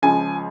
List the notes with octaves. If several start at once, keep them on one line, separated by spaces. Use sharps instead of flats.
C#2 C#3 F3 G#5